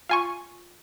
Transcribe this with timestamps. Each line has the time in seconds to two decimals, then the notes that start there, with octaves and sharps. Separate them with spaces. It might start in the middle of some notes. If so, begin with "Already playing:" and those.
0.09 F4 G#5 C#6